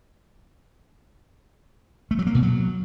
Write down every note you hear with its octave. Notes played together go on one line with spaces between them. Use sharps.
A3
F#3
A#3
B2
F#3